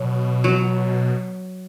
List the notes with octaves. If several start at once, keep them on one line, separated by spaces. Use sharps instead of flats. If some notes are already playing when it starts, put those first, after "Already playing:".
Already playing: B2 F#3
F#3